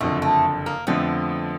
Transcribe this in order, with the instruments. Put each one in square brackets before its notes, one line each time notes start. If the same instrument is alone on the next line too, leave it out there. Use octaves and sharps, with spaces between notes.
[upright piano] F#1 F2 D3 [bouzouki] A3
[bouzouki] A3
A#3
[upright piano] F2 D3 F3 A3 C4 [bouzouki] B3